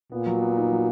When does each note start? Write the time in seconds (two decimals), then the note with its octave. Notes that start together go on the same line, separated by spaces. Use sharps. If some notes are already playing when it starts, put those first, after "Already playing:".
0.12 A#2 B3
0.26 F#3
0.41 B3
0.57 D#4
0.71 F#3